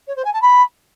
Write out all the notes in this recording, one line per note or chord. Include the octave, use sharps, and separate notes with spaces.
C#5
C5
G#5
A5
B5